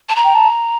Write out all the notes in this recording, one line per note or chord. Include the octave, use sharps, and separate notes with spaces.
A5
A#5
G5
A5